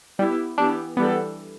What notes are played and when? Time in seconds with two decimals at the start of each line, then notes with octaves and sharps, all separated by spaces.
0.18 G3 B3 E4 G4
0.58 E3 B3 D4 G4
0.96 E3 G3 B3 D4 A4